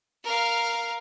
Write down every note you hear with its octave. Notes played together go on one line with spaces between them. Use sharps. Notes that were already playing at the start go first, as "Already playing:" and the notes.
A#4 F5